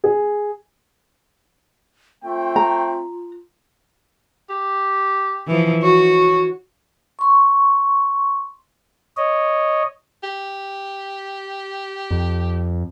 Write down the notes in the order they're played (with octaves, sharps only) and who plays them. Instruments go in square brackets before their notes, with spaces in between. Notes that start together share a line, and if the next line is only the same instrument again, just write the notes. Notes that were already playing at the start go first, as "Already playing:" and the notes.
[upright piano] G#4
[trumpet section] A3 C4 G5 [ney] F4
[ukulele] A#5
[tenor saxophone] G4
[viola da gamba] E3 F3
[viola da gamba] F#4 [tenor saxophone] C#5
[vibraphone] C6 C#6
[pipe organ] C#5 D#5
[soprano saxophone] G4
[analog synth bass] F2